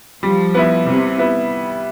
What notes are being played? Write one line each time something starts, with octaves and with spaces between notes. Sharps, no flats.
F3 G3
B3 E4
C3 G3
B3 E4